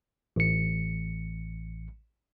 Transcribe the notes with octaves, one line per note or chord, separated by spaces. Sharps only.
A1 C#7